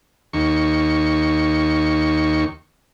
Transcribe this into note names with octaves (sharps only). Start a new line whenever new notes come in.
D#2 C#6